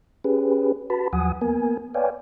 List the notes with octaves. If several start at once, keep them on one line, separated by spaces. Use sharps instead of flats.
C#4 G4 G#4 B4
F#4 B4 A5 B5
D#2 F3 F#3 F#5 G#5 D#6
A#3 B3 A#4 G#5
B4 C#5 D5 F5 G5 G#5